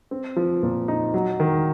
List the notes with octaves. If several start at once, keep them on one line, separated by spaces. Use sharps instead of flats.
C4
F3
A#2
D#4
F#3
D#3